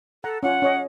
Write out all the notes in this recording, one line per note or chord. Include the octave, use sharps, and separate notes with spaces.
A4 F#5 A#5
C#4 F4 F#5
C#4 C#5 D#5